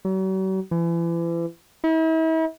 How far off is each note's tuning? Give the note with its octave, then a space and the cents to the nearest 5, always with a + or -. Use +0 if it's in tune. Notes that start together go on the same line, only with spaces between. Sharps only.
F#3 +45
E3 +35
E4 -40